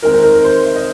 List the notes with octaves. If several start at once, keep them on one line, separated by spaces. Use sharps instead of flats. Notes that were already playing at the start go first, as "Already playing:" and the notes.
D#3 G#3 C4 A#4
A#4
A#4
A#4
C5
E5
D#5